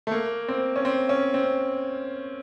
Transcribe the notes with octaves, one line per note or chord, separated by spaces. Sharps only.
A3
A#3
C4
C#4
C4
C#4
C4